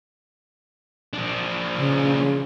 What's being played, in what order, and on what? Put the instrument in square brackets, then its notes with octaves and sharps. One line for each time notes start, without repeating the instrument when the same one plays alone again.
[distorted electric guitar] F3 D4
[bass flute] C#3